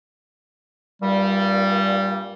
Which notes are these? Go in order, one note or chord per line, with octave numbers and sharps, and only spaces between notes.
G2 A#2 G3